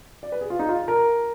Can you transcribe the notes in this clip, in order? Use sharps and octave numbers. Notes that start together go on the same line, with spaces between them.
D5
B4
G#4
F4
D#4
F4
A#4